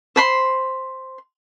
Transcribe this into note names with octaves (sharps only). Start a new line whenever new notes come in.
C5 B5 C6